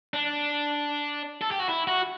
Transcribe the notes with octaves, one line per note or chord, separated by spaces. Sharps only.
D4
A4
G4
F#4
E4
F#4